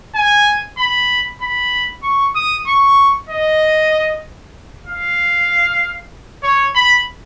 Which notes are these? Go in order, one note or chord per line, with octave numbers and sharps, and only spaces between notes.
G#5
B5
B5
C#6
D#6
C#6
D#5
F5
C#5
B5